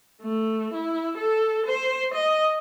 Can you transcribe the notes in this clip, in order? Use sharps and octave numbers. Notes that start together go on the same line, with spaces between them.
A3
E4
A4
C5
D#5